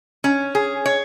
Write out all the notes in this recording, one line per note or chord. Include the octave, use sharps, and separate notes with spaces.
C#4
G#4
C#5